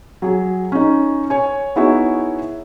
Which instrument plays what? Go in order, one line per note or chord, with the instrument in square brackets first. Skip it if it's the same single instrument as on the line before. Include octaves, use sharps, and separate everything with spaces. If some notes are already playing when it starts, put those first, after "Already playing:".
[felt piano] F#3 G#4
C#4 D#4
C#5 G#5
B3 D#4 E4 F#4 G#4 C#5